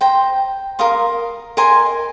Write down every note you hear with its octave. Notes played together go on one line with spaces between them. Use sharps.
C5 G5 A#5
A#4 F5 C6 D#6
A#4 D#5 G#5 C6